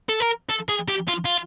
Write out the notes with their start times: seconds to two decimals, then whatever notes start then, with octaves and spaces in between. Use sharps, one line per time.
0.09 A4
0.20 A#4
0.49 A4
0.69 G#4
0.88 G4
1.08 F4
1.25 F4